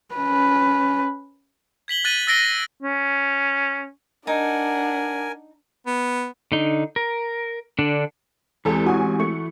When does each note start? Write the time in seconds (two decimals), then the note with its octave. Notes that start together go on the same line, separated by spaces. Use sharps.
0.15 C#4 B4
1.88 G#6 B6 F#7 G7
2.05 F#6 A6 B6 D#7 F#7
2.27 E6 A6 A#6 C7 D7 G7
2.45 D#7
2.83 C#4
4.27 D4 D#4 A#4 F#5 G#5
5.86 B3
6.52 D3 D#4
6.96 A#4
7.79 D3 D4
8.65 E2 E3 G#3 C4 G4 A4
8.86 A1 F#4 G#5
9.20 A3 C#6